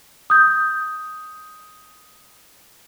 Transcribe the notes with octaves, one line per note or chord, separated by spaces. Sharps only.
D#6 G6